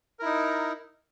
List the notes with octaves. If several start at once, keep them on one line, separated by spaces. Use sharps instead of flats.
D#4 E4 A#4